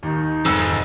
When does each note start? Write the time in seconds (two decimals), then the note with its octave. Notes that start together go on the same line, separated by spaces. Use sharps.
0.03 D#2 D#3 D#4
0.45 F1 G#2 E6